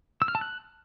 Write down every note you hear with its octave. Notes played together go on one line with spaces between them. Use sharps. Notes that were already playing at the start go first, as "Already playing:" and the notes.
E6
F6
A5
F#6